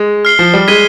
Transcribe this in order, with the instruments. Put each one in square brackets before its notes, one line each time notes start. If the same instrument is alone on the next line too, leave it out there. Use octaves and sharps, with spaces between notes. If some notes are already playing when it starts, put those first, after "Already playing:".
Already playing: [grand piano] G#3
[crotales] F6 C7 G7
[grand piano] F3
G3
[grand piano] G#3 [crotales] G#6 B6 D#7 G7